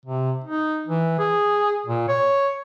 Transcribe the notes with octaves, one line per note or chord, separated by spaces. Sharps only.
C3
D#4
E3
G#4
A#2
C#5